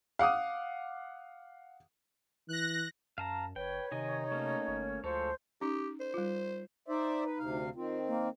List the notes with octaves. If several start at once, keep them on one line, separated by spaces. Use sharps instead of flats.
F5 F#5 D6 D#6
E3 F#6 A#6
F#2 F5 A5 A#5
F#1 B4 C#5 G5
C3 D#3 D#4 D#5 G#5
A3 A#3 C#4
G1
D2 F3 G#3 A4 C5 C#5
C#4 D#4 G4
C5
G3 F4
D#4 C5 D5 E5
B4
D2 C3 F5
D#3 C4 F4
A#3